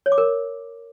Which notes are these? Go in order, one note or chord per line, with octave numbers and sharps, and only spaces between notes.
C#5
D6
A#4